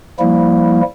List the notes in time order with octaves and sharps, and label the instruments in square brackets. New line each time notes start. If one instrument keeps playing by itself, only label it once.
[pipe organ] F3 G3 A#3 E4